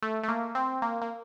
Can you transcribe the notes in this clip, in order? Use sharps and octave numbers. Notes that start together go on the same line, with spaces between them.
A3
A3
A#3
C4
A#3
A#3